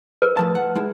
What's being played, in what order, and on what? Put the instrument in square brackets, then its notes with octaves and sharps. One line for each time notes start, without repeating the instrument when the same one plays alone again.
[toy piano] A#4 B4
[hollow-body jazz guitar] A2 F3 A5
F#5
G#3 E4